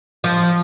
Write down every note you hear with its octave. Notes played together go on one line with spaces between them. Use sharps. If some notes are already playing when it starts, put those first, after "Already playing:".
F3